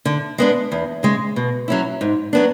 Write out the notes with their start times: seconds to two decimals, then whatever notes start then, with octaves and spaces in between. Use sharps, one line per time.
0.05 D3
0.38 G#3 B3 D4
0.72 E2
1.03 C#3 G#3
1.36 B2
1.68 F#3 C#4 E4
2.01 G#2
2.33 F#3 B3 D4